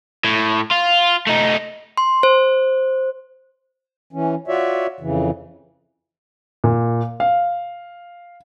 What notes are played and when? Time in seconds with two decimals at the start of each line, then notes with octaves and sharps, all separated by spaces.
0.25 A2
0.71 F4
1.27 A3 D#4
1.98 C6
2.23 C5
4.13 E3 C#4
4.48 F4 F#4 C#5 D5 E5
5.00 F2 C#3 E3
6.64 A#2
7.20 F5